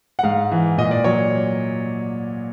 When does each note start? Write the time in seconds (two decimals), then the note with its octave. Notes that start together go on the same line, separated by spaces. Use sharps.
0.19 F#5
0.23 G#2 F5
0.52 E3
0.78 A#2 D#5
0.91 D5
1.04 F#3 C#5